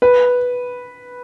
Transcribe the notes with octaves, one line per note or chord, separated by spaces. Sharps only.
B4